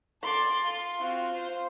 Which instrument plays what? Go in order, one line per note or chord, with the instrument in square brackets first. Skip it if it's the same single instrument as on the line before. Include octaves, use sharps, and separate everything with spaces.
[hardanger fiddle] A4 D5 [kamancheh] C6
[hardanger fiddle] F4
[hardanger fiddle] C4 F#4 [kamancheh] F4
[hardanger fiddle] C5 C6